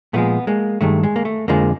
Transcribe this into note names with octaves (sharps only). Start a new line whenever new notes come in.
A#2 F3 G#3 A3 B3
G#3 A#3
G2 D#3 G#3 A3
G#3
A#3
A3
F2 D3 F3 G#3 A#3